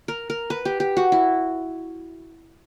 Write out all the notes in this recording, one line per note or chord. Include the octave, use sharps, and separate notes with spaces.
A#4
A#4
B4
G4
G4
F#4
E4